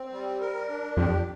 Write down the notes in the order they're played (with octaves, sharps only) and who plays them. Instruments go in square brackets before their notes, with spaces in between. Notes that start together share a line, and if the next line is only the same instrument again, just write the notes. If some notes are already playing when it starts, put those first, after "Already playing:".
Already playing: [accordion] C4
G3
A#4
D4
[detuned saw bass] F2 [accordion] G4